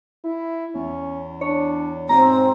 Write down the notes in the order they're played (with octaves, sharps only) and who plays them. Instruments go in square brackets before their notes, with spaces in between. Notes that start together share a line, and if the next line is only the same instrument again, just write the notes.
[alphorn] E4
[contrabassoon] E2 [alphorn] C#4
[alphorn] D4 [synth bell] C#5
[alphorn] G#2 [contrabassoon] B2 [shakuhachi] C4 [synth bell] A#5